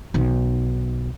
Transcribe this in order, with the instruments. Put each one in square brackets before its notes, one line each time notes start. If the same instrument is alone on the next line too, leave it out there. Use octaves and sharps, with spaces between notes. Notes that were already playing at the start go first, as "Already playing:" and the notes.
[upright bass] B1 D#3